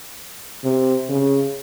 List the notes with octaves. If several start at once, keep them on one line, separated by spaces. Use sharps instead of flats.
C3
C#3